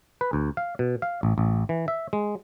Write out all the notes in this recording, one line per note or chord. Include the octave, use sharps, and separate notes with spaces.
B4
D2
F5
B2
F5
A1
A1
E3
E5
G#3